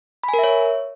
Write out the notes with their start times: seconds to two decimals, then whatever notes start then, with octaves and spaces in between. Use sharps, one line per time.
0.24 B5
0.29 G#5
0.34 A#4
0.39 E5
0.44 C#5